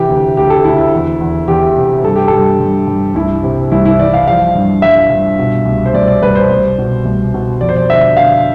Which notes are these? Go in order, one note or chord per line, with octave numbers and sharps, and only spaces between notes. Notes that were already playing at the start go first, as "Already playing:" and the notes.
Already playing: C3 E3 G4
D2
D2 G4
A4
D2 E4
E4
E2
E2
E2 G4
C3
G2 A4
G4
G2 A4
G2
G2
C2 E4
C3
C2 E4
E4
E3 D5
F5
F3 F5
G2
G2 E5
G2
B2
C2
C5
C2 D5
D5
C2 B4
C5
C2
B2
C2
B2
F2 D5
C5
D5
D3 E5
D3 F5